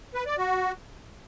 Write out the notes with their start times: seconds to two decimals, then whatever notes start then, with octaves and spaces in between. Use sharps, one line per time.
0.14 B4
0.26 D5
0.38 F#4